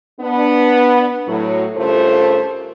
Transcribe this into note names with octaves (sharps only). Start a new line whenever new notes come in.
B3 D4
A2 F#3
G2 C#3 A3 F4 A#4 C5